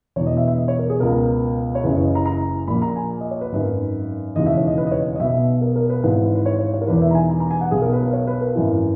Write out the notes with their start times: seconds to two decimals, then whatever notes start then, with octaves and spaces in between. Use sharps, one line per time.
0.16 E1 E2 B2 C#5
0.26 D#5
0.37 E5
0.48 E5
0.58 D#5
0.68 C#5
0.79 A#4
0.90 G#4
1.00 C#2 B2 A#4
1.75 C#5
1.84 F#1 F#2 C#3 E3 B4
1.94 C#5
2.05 D#5
2.15 A#5
2.26 A#5
2.68 A#1 A#2 B5
2.82 A#5
2.96 G#5
3.21 D#5
3.31 C#5
3.41 B4
3.52 G#1 F#2 D#3
4.36 E1 D#2 C#3 E3 D#5
4.46 E5
4.57 C#5
4.68 D#5
4.78 B4
4.87 D#5
4.91 C#5
5.16 D#5
5.19 B1 B2 E5
5.61 A#4
5.76 A#4
5.90 B4
6.04 G#1 G#2 E3 B4
6.24 B4
6.35 B4
6.46 C#5
6.59 C#5
6.74 C#5
6.81 A#4
6.87 E1 E2 D#3 B4
7.02 E5
7.11 A#5
7.15 G#5
7.29 A#5
7.40 A#5
7.51 G#5
7.61 F#5
7.71 B1 B2 G#4
7.82 A#4
7.93 B4
8.03 A#4
8.13 C#5
8.27 B4
8.41 A#4
8.55 G#1 F#2 E3